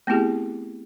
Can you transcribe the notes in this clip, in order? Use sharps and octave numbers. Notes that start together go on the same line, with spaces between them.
A3 B3 C4 E4 G4 G#4